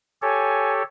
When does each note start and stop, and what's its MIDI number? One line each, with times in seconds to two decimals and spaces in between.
0.22 0.83 67
0.22 0.83 69
0.22 0.83 73
0.22 0.73 80